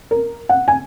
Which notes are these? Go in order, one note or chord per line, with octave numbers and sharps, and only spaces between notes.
A#4
F#5
G#5